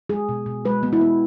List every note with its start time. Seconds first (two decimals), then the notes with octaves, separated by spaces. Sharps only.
0.10 G#3 G#4
0.29 B2
0.46 B2
0.65 G#3 B4
0.83 B3
0.93 E4
1.01 B3